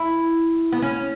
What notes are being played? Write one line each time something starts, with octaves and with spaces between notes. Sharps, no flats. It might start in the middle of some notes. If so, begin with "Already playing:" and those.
Already playing: E4
B3
C#4